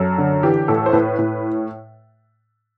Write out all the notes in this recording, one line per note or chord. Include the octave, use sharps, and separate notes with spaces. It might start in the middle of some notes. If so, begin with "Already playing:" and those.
Already playing: F#2 A4
D3
E3 G4
A2 A4
C5
A2 B4
A2